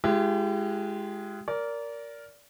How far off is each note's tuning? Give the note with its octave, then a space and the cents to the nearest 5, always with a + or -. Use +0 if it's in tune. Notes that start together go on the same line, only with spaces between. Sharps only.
G#3 +0 E4 +45 G4 -15
A#4 +0 D5 -25